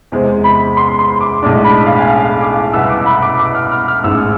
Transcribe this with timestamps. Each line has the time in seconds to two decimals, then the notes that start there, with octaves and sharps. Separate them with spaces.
0.12 E2 C3 G#3 C4
0.44 B5
0.77 C6
0.99 C6
1.21 D6
1.43 B1 A2 G#3 D4 D6
1.64 B5
1.86 F5
1.99 G#5
2.08 F5
2.41 D6
2.73 C2 B2 B3 E6
2.90 D6
3.06 B5
3.22 D6
3.39 D6
3.55 F6
3.72 F6
3.88 F6
4.04 A1 G#2 G#3 E6